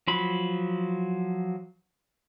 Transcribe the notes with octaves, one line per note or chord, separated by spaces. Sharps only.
F3 F#3 B5